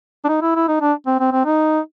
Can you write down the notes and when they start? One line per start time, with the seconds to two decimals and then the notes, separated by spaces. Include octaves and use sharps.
0.25 D4
0.29 D#4
0.42 E4
0.56 E4
0.68 D#4
0.81 D4
1.07 C4
1.20 C4
1.32 C4
1.45 D#4